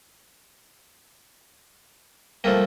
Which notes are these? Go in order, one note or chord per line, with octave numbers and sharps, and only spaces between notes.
F3 G3 A3 A#3